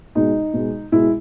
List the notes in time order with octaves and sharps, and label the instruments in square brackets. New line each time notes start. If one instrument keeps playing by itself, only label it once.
[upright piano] B2 G#3 D#4
B2 G#3
B2 G#3 E4